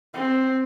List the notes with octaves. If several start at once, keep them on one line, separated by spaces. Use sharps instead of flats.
C4